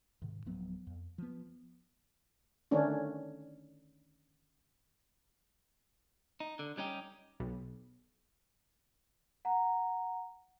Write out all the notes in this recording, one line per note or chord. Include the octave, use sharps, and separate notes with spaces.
G#2 C3 D#3
D1 F3 F#3 B3
F2
F3 B3
D3 D#3 A3 C#4 D4
D#4
D3
G3 C#4 D#4 G4
B1
F#5 A#5